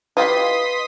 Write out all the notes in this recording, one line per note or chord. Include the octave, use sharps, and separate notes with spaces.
E4 F4 G4 B4 D#5 C6 D#6 B6